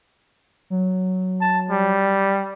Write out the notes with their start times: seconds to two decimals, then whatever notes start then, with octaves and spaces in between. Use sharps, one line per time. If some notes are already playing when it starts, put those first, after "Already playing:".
0.70 F#3
1.41 A5
1.71 G3